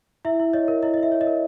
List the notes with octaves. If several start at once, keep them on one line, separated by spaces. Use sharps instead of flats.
E4 E5
E4
C#5 D#5
A#4
E4 D#5
D#5
E4
E5
C#5
D#5
A#4